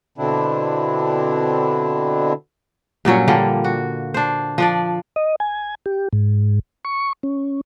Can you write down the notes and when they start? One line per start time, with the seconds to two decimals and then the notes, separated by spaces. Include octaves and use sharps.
0.18 B2 D3 C4 D4 E4
3.05 G2 A#2 F#3 C#4
3.28 D3 F3 G3 A#3
3.64 F#4
4.14 D4 C5
4.58 F3 D4 D5
5.16 D#5
5.40 G#5
5.86 G4
6.13 G#2
6.85 C#6
7.23 C#4